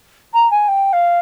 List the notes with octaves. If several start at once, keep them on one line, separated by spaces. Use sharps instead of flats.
A#5
G#5
G5
F5